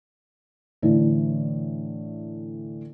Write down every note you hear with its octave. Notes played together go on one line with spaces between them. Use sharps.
A2 D3 E3